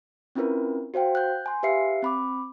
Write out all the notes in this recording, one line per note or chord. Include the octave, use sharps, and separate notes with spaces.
C4 C#4 E4 F4 A#4 B4
F#4 C5 F5 G5
F#6 G6
G#5 C6
G4 B4 E5 F5 C7 C#7
C4 B5 D6